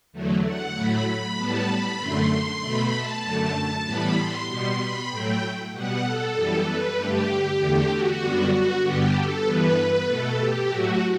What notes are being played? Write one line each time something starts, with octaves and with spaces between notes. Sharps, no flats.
E2 D3 F#3 A3
F#5
A2 F#3 A3 B5
B5
A2 G3 B3 A5
B5
F#2 D3 A3 C6
C6
B2 A3 B5
A5
F#2 D3 A3
A2 E3 G3 B3 B5
C6
B2 G3 B3 C6
B5
A2 F#3 A3 G5
B2 G3 B3 F#5
A4
F#2 E3 G3 B3
B4
G2 D3 A3 G4
E2 D3 A3
F#4
F#2 D3 G3 B3
F#4
G2 D3 G3 B3 G4
A4
G2 E3 B3 B4
B4
B2 A3 A4
G4
A2 F#3 A3 F#4